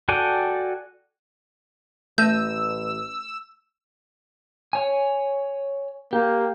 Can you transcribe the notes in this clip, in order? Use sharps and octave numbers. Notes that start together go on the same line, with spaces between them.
F#4 A4 D5 G5 G#5
A1 A3 E6 G6 A#6 D#7
C#5 G#5
A#3 G4